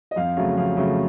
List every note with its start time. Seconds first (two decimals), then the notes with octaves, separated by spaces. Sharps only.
0.11 D#5
0.16 F2 F5
0.37 C#3 F#3 A3 F5
0.57 F2 F5
0.77 C#3 F#3 A3